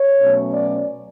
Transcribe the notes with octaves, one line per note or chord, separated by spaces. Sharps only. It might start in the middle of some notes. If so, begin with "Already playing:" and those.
Already playing: C#5
B2 F#3 A3 C#4
D5